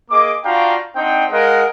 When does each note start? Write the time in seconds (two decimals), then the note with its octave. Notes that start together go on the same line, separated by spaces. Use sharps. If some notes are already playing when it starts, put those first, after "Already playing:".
0.11 A#3 G#4 D#5 D6
0.45 D4 F4 F#4 F5 G5 A#5
0.96 C4 D4 D#4 C5 F#5 G5
1.31 G#3 A#4 D#5 F5 F#5